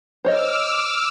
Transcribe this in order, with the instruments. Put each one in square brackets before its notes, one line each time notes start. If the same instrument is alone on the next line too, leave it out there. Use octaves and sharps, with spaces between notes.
[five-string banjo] C5 C#5 D#5 [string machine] D6 E6 F6